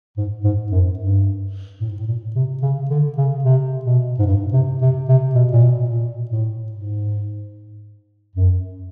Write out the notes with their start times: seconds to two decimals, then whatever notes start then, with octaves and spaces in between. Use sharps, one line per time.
0.17 G#2
0.44 G#2
0.71 F#2
0.99 G2
1.80 A2
1.89 G#2
1.98 A2
2.07 A#2
2.35 C3
2.62 C#3
2.90 D3
3.17 C#3
3.44 C3
3.85 B2
4.19 G#2
4.26 G2
4.53 C3
4.81 C3
5.08 C3
5.35 B2
5.52 A#2
5.62 B2
5.90 A#2
6.31 A2
6.72 G#2
8.36 F#2